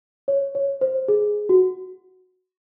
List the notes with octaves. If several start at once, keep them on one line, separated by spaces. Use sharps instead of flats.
C#5
C#5
C5
G#4
F#4